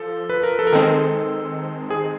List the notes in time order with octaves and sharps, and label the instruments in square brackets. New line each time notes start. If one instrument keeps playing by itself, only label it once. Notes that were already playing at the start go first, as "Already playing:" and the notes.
Already playing: [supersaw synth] F3 [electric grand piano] A4
[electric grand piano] B4
A#4
A4
A#4
[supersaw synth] D#3 G#3 C4 [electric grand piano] A4
[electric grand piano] G#4